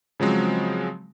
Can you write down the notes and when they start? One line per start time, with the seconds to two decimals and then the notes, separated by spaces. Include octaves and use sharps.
0.20 C#3 F3 F#3 G#3 C4